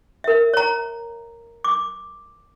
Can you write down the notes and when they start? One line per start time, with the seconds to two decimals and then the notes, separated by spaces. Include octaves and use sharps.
0.24 A#4 E5
0.53 C#5 A#5
1.64 D6